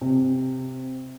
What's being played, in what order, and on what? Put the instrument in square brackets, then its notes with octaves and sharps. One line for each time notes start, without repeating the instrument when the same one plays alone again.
[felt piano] C3